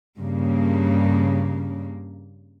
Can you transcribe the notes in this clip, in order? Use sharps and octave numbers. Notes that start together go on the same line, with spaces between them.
G2 C#3 A#3